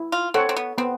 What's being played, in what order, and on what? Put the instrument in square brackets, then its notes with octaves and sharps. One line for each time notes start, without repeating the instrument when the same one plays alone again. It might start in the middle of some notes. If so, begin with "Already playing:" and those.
Already playing: [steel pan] E4
[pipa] F4
[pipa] C4 [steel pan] A4 C#5 F#5
[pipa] C4
B3
[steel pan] B3 [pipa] C4